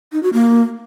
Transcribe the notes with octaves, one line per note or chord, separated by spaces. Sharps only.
D#4
F#4
A#3